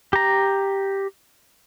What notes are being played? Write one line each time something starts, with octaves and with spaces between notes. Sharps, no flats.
G4 A#5